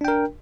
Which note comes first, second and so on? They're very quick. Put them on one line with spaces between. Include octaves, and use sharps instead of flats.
D4 G5 A#4